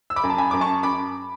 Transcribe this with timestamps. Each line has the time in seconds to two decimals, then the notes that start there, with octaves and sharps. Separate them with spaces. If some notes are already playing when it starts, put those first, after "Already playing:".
0.10 E6
0.16 B5 D6
0.23 F#2
0.30 A5
0.38 G#5 B5
0.51 F#2 D6
0.61 A5 C#6
0.83 F#2 B5 D6